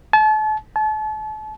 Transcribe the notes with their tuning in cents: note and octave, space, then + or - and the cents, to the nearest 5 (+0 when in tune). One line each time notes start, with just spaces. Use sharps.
A5 -35
A5 -35